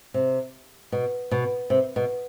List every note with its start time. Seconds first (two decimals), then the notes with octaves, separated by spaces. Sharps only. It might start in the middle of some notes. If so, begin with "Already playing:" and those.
0.14 C3
0.92 B2
1.31 B2
1.70 C3
1.96 B2